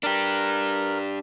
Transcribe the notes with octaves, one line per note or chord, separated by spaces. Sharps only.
D4 G4 A#4